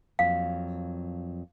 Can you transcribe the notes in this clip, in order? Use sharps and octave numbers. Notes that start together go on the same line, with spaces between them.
F2 F#3 A#3 F5